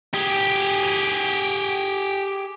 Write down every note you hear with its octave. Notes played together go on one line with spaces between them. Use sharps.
G4 G#4